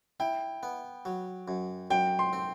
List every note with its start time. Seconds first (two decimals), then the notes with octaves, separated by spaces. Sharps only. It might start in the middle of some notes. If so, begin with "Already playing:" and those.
0.20 E4 G5
0.63 B3
1.05 F#3
1.48 F#2
1.91 F#2 G5
2.19 C6
2.33 C4